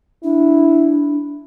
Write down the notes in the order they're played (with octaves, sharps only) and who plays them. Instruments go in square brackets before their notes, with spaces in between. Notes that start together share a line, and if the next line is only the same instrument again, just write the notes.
[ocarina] D4 [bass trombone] E4